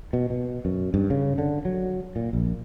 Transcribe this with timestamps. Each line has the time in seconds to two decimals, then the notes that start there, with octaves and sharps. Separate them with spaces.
0.13 B2
0.30 B2
0.65 F#2
0.94 G2
1.10 C#3
1.38 D3
1.65 F#3
2.16 A#2
2.33 A#1